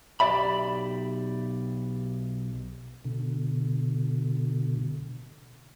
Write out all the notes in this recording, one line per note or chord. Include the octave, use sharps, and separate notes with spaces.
B1 G4 D5 E5 B5
B2 D3